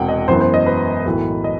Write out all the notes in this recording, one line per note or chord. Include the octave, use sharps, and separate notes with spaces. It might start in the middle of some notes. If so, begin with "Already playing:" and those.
Already playing: E1 E2 C3 E3 F#5 G5
D#5
F#2 E3 B3 C5
C5
D#5
B4
B1 A2 E3
D#5